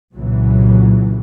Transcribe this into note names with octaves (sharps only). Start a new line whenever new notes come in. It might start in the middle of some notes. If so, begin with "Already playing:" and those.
C2 A#2 C#3 E3 F#3